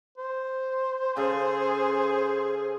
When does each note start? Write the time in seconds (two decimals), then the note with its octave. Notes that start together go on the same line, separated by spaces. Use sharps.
0.18 C5
1.17 C#3 G#4 A4